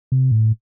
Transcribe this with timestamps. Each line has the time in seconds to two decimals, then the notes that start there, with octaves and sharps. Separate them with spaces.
0.12 C3
0.31 A2